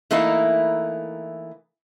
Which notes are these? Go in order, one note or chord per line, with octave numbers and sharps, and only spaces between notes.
E3 A3 A#3 D#4 E4